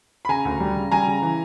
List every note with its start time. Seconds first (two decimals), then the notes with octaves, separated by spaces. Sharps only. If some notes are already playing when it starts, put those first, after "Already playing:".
0.25 B5
0.29 C#3 G#5 A#5
0.45 D2
0.60 G3
0.76 C#3
0.92 G3 G#5 A#5
1.07 C#3
1.22 E3